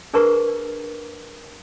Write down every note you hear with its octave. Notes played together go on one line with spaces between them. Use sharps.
D4 G#4 A#4 B4 A#5 C#6